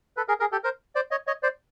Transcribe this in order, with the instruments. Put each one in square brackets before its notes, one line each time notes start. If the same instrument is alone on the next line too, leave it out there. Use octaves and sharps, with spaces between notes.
[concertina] A4 B4
G#4 A#4
G#4 A#4
G4 A4
A#4 C5
C5 D5
C#5 D#5
C#5 D#5
C5 D5